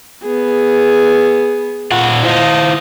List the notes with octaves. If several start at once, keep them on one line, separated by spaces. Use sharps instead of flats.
B3 G#4
A#2 F4 F#5
E4 C5 D#5 F5